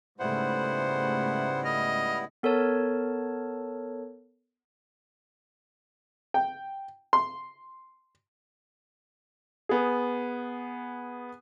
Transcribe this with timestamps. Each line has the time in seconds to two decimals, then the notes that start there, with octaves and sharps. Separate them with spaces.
0.20 G#2 C#3 G3 A3 B3 E4 C5 F#5
1.65 D#5 F6
2.43 B3 A4 A#4 C#5 A5
6.34 G5
7.13 C6
9.69 B3 G#4